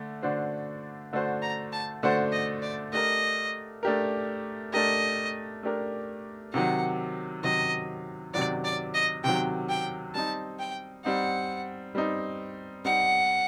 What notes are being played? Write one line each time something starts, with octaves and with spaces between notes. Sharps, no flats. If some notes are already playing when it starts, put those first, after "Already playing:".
Already playing: D3 A3
D3 A3 D4 F#4 C5
D3 A3 D4 F#4 C5
A#5
A5
D3 A3 D4 F#4 C5 F#5
D#5
D5
A3 D4 G4 A#4 D#5
A3 D4 G4 A#4
A3 D4 G4 A#4 D#5
A3 D4 G4 A#4
C3 D#3 F#3 F#5
C3 D#3 F#3 D#5
C3 D#3 F#3 D5
D5
D#5
C3 D#3 F#3 G5
G5
G3 C4 D#4 A5
G5
G3 C4 D#4 F#5
G3 C4 D#4
G3 C4 D#4 F#5